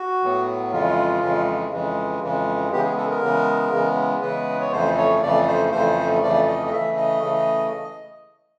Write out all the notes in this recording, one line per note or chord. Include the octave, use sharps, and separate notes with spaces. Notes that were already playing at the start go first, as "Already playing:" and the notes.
Already playing: F#4
A2 F#3 B3
F2 C#3 E3 G#3 F4
F2 C#3 E3 G#3
F2 C#3 E3 G#3
F2 C#3 E3 G#3
C#3 E3 G#3 B3 G4
G#4
A4
A#4
C#3 E3 G#3 B3
C#3 E3 G#3 B3
C#3 E3 G#3 B3 B4
C#5
F2 C#3 E3 A3 C5
C#5
F2 C#3 E3 A3 D5
C5
F2 C#3 E3 A3 C5
F2 C#3 E3 A3 D5
D#5
D#5
C#3 E3 A3 E5
D#5
C#3 E3 A3